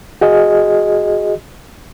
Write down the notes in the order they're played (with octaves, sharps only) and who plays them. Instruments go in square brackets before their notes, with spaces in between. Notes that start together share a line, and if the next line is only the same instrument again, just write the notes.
[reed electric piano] F#4 G#4 D#5